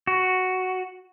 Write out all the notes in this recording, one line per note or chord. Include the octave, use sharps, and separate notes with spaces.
F#4